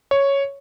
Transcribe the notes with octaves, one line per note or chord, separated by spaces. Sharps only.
C#5